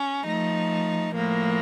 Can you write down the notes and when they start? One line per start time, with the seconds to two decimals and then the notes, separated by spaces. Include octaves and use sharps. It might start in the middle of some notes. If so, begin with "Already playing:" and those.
Already playing: C#4
0.24 F3 A3 D#4
1.14 A2 F3 A#3